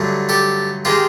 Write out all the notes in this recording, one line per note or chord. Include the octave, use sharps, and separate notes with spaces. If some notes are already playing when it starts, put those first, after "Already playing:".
Already playing: G2 D3 F#3 A3
G4 A4
D#3 G#3 F4 G4